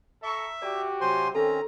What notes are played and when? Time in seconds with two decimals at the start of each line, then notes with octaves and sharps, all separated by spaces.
0.23 A4 E5 A#5 C#6
0.62 F#4 G4 D5 A#5 D6
1.01 C3 F#3 C5 G#5 C6
1.35 D#3 C4 C#4 A4 A#5